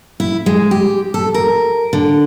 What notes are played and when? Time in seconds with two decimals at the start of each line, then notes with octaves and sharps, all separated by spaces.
0.20 E4
0.46 G#3
0.71 G4
1.14 A4
1.34 A#4
1.93 D3